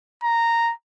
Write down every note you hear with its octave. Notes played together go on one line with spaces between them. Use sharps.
A#5